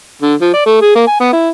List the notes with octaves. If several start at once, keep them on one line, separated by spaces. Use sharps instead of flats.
D3
F3
D5
A3
G#4
A#3
G#5
B3
E4